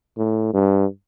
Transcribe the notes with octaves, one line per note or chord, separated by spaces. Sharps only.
A2
G2